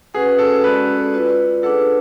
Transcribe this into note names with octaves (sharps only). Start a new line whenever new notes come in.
C#4 F#4 G#4 B4 F#5
A4
G#3 C#4 F#4 A4 B4 D5
F4 B4 D5
D4 G#4 A4 B4 F#5